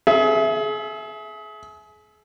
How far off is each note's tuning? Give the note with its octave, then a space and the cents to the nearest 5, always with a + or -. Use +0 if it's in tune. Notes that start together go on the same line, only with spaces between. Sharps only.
G#4 +35 E5 +0